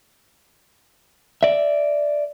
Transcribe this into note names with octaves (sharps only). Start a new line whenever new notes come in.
D5 E5